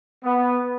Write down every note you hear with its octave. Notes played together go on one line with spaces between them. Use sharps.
B3